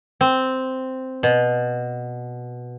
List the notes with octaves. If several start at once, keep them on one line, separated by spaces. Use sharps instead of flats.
C4
B2